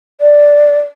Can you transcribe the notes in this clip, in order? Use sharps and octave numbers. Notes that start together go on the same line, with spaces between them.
D5